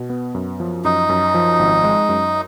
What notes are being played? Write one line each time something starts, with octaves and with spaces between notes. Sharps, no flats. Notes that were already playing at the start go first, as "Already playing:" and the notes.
Already playing: B2
B3
F#2
F3
F#2 D#4
F#2
F3
G#1
G#3
F#2